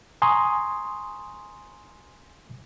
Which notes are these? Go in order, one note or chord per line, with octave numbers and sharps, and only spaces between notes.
G#5 A#5 C6 C#6 D#6